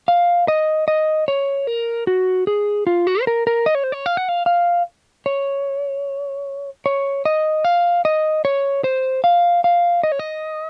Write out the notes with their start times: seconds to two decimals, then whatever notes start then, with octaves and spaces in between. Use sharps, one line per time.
0.08 F5
0.48 D#5
0.88 D#5
1.28 C#5
1.67 A#4
2.07 F#4
2.47 G#4
2.87 F4
3.07 F#4
3.21 C5
3.27 A#4
3.47 A#4
3.66 D#5
3.75 C#5
3.84 C5
3.92 C#5
4.06 F5
4.17 F#5
4.29 F5
4.46 F5
5.26 C#5
6.86 C#5
7.25 D#5
7.65 F5
8.05 D#5
8.45 C#5
8.84 C5
9.24 F5
9.64 F5
10.03 D#5
10.12 C#5
10.19 D#5